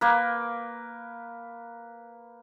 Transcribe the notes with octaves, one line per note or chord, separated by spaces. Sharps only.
A#3 B4